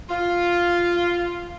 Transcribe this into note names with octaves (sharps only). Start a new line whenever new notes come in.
F4